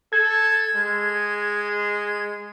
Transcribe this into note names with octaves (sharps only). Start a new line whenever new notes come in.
A4 G#6
G#3